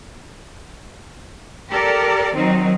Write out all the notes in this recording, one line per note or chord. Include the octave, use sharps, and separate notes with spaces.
G4 A4 A#4 D5
D#3 F#3 C4 D#4